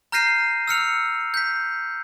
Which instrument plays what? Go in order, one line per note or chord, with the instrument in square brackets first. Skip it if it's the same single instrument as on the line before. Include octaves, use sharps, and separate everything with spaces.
[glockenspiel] A#5 F6 G6 A#6 C7 D#7
E6 F6 C#7 F7
G6 B6